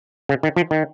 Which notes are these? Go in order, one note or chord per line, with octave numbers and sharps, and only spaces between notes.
C#3
D#3
F3
D#3